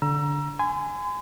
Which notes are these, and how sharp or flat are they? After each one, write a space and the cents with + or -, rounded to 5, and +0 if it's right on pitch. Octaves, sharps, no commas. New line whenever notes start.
D3 -15 A#5 +20 E6 +25
G#5 +0 C6 -45